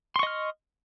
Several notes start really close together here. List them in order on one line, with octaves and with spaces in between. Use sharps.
C6 C#6 D#5 F6